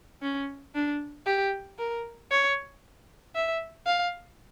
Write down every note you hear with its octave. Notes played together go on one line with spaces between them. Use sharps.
C#4
D4
G4
A#4
C#5
E5
F5